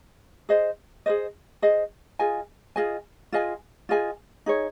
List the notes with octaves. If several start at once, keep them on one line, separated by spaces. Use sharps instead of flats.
G#4 C5 D#5
G#4 C5 D#5
G#4 C5 D#5
F4 G#4 D#5 G#5
F4 G#4 D#5 G#5
F4 G#4 D#5 G#5
F4 G#4 D#5 G#5
D#4 G#4 C#5